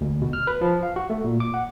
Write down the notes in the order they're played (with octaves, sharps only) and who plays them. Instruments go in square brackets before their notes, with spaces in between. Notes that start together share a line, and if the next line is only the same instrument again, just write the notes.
[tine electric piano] D2
B2
F6
B4
F3
F5
F#4
A3
A#2
D6
F#5